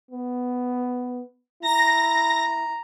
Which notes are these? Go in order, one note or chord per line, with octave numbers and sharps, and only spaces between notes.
B3
E4 A#5 A#6